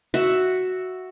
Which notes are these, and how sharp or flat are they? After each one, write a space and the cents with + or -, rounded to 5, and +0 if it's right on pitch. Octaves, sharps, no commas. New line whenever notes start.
F#4 +0 E5 +0